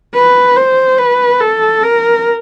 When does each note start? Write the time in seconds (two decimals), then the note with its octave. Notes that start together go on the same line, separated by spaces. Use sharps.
0.15 B4
0.56 C5
0.98 B4
1.40 A4
1.83 A#4